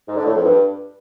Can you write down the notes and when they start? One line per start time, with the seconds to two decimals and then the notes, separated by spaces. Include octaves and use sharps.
0.07 G#2
0.16 D3
0.26 A2
0.35 F2
0.44 G2